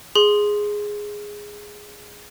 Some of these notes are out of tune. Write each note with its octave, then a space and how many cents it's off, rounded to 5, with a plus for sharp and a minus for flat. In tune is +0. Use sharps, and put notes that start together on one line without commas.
G#4 +0 C6 +0